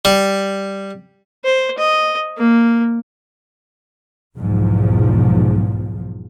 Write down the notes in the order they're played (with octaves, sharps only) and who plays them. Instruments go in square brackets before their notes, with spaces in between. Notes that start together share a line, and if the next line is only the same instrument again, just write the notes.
[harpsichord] G3
[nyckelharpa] C5
D#5
A#3
[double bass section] B1 E2 G#2 F3